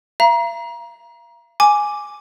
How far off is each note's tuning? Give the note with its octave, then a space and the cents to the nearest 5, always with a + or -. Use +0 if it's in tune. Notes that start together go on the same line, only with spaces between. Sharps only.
F5 -40 A#5 +25
G#5 +0 D6 +0